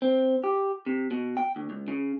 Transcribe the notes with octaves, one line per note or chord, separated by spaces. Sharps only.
C4
G4
C3
B2
G5
D2
C#2
C#3